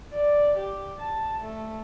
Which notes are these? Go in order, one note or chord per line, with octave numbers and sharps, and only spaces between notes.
D5
G4
A5
A3